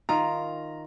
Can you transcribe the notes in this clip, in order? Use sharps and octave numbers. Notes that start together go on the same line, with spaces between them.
D#3 F4 A#4 A#5